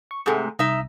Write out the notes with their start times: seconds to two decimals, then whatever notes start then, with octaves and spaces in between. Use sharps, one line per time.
0.11 C#6
0.26 G#2 C3 A3 G#4 F#5
0.59 C2 D#4 E5